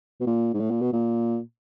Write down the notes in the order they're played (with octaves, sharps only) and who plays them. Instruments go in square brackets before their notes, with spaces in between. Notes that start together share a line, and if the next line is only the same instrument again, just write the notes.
[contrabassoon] B2
A#2
G#2
A2
A#2
B2
A#2